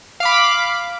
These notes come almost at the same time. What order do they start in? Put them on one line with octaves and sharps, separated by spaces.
F5 D6 B5